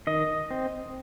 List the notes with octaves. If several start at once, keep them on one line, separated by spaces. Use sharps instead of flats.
D#3 D#5
C4